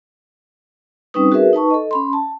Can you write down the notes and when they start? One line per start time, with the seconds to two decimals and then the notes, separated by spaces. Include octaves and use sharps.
1.14 G3 C4 C#4 D#4 B4 D#6
1.32 F#4 G#4 A#4 B4 E5
1.53 D#4 B4 A5 C#6
1.70 A4 D#5
1.91 C#4 B5 C6
2.13 A5